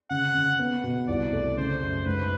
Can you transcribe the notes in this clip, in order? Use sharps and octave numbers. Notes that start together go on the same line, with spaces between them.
C#3 F#5
C#3
B3
B2
C2 D5
A3
C#3 C5
F#2
G#2 B4